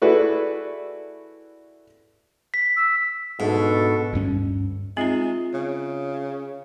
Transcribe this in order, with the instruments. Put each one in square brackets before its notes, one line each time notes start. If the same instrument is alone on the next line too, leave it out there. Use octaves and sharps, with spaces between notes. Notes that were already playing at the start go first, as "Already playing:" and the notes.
[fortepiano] A3 E4 F#4 G#4 B4 D5
[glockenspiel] B6
[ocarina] E6
[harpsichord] G#2 [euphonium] B2 [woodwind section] A3 D4 A4
[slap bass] D2 G2 C#4
[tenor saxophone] G#3 [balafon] C4 D#4 [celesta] F4 E5 C7
[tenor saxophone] C#3